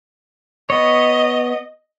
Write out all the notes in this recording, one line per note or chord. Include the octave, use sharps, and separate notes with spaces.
B3 C#5 D#5